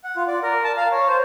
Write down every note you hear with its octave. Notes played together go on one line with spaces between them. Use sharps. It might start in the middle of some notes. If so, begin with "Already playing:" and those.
F#5
F4
D5
A#4
A5
F5
C#5
C5